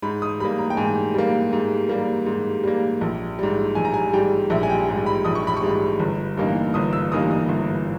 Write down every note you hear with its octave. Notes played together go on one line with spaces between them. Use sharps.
G#2 B5
D#6
G3 A#3 B5
A#5
G5
G#2 G#5
G3 A#3
G#2
G3 A#3
G#2
G3 A#3
A#1
G#2 G3
A#1 G#5
A#5
G#5
G#2 G3 G5
A#1 E5
G#5
G5
G#2 G3
B5
A#1 D#6
C#6
B5
C#6
G#2 G3
G1
G2 E3 A#3 D#4
G1 D#6
E6
G2 E3 A#3 D#4 D#6
D#6
G1